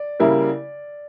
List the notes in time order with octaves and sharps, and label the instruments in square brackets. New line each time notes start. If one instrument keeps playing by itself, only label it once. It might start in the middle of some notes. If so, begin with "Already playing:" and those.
Already playing: [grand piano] D5
[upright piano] C#3 G3 A#3 E4 A#4